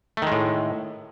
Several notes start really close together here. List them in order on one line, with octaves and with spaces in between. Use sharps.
A3 D#3 G#3 A2